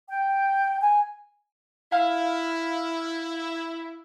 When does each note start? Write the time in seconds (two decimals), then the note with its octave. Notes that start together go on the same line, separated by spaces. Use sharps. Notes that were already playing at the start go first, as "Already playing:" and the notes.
0.09 G5
0.81 G#5
1.92 E4 F5 F6